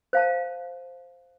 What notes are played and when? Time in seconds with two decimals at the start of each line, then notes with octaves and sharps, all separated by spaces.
0.13 C5 F5 A5